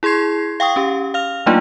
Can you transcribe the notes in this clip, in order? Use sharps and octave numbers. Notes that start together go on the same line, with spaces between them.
E4 G#4 C6 G#6 C7
F5 G5 C#6 D#6
C#4 G4
F5 F6 F7
F#3 A3 A#3 D4 D#4 F4